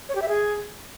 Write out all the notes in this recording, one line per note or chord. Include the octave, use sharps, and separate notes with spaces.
C#5
G4
E5
G#4